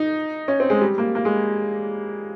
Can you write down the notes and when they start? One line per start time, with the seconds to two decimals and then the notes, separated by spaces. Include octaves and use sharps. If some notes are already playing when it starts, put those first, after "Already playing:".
Already playing: D#4
0.48 C#4
0.60 C4
0.70 G#3
0.81 G3
0.98 A#3
1.15 A#3
1.25 G#3